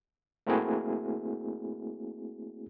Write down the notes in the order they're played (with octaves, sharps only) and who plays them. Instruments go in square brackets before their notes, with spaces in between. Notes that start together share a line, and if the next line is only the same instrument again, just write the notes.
[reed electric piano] A3 A#3 C4 E4 F#4 G#4